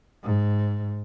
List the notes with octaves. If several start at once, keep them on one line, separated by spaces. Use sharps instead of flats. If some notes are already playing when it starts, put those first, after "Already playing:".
G#2